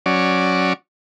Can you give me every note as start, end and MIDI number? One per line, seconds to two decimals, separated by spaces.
0.06 0.73 54
0.06 0.73 61
0.06 0.73 74